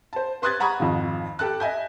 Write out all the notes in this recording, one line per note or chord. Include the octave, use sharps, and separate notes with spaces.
C5 A5
B4 C6 D#6 F#6 G#6 A6
F#5 A#5 B5 C#6 D#6 G#6
G#1 F2
G4 A4 A5 F#6
D#5 E5 G#5 G6